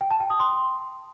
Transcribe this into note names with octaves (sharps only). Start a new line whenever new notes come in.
G5
A5
G5
D#6
C6